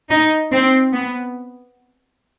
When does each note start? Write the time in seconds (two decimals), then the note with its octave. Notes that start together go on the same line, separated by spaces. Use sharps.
0.10 D#4
0.52 C4
0.93 B3